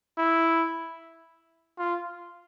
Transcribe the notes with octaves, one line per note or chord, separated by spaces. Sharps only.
E4
F4